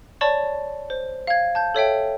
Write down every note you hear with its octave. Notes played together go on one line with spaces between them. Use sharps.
C#5 D5 A5 B5 C#6
C5
F5 G#6
A5 G6
A4 C#5 E5 G5